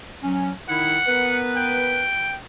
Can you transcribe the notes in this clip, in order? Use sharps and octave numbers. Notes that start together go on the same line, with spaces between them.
F#3 C#4
D#3 D#4 E4 F#5
B3 A#4 B4
G5